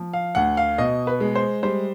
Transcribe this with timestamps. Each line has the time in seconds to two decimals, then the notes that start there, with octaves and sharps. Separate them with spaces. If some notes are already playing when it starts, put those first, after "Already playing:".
Already playing: F3
0.13 F5
0.35 D2 F#5
0.57 F5
0.78 B2 D#5
1.07 B4
1.20 G#3
1.35 C5
1.63 G3 C5